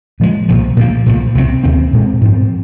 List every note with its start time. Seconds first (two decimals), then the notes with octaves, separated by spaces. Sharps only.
0.20 A#2 F3 G#3
0.49 C2 A#2 F3
0.77 A#2 F3 A#3
1.06 C2 A#2 F3
1.35 C2 C3 G#3 C4
1.64 D#2 D#3 C4
1.93 A#2 G#3 C4
2.21 G#2 F3 C4